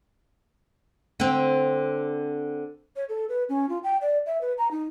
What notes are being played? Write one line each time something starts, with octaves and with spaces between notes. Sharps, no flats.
D3 C4
C#5
A4
B4
C#4
F4
G5
D5
E5
B4
A#5
D#4